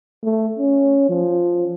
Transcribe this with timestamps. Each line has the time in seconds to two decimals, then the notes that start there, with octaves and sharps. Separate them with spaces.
0.24 A3
0.59 C#4
1.09 F3